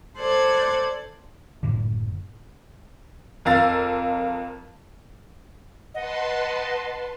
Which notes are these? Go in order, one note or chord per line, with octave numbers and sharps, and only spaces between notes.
A4 C5 D5 F#6 G#6
F#1 A2 D3
F2 A#4 F5 E6 A6
B4 D#5 F#5 A5 C6